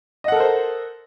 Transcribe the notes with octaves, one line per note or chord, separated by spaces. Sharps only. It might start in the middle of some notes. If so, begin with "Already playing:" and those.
A4 A#4 C5 D#5 F#5